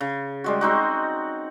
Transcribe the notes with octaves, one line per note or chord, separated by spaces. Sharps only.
C#3
G3 G#3 F#4
C4 D#4 F#4